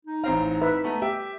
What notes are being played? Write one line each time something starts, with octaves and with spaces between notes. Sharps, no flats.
D#4
A1 C4 F5 A#5
B4 E5
A3 B3 A#5
G4 E5 G5